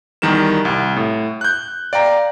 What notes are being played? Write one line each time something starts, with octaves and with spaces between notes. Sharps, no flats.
E2 D#3 G3 A#4 E7
C2
A2
F#6 G6
D5 F5 G5 A#5